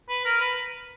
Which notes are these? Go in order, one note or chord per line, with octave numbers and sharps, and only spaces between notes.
B4
A#4
B4